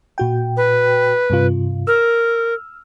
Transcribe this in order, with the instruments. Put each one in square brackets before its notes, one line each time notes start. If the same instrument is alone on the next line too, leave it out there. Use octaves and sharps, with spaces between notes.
[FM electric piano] A#2 F#4 G5
[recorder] B4
[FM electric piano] G2 C3 F4
[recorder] A#4 [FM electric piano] E6 F6